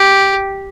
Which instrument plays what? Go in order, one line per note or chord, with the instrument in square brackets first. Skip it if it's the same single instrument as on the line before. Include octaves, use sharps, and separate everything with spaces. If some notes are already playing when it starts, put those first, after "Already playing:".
Already playing: [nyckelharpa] G4